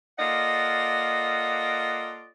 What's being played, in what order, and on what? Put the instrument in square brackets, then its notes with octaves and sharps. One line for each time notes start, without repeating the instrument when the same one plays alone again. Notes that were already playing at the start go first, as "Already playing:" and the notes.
[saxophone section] A#3 F4 A4 D5 D#5 F#5